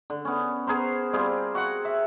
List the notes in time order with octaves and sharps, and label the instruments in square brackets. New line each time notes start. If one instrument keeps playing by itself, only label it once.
[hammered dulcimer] D3
B3 C#4
B3 G#4 A#4 C5
G3 C4 F4 G#4
F#4 F#5
E5